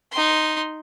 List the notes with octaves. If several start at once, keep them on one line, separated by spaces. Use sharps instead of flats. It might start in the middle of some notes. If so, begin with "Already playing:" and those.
D#4 C6